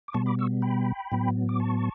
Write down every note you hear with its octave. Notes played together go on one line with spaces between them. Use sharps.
D6
B2 G3 B3 A5 C#6
B5 D6
C#6 E6
G5 B5
A2 F#3 B3
D6
A5 C#6